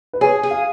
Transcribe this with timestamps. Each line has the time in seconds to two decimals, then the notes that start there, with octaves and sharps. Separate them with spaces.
0.13 B4
0.21 G#4 C#5
0.43 G#4
0.51 F5